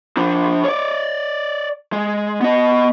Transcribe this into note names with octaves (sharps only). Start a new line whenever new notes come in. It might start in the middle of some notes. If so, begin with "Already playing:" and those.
F3 D4
C#5 D5
G#3
B3 D#5